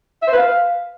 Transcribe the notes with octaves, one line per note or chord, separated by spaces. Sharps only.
E5
C5
B4
F5